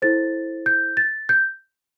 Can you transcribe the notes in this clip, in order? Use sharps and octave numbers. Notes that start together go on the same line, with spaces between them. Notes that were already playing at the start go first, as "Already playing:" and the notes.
E4 A4 C5 A6
G6
A6
G6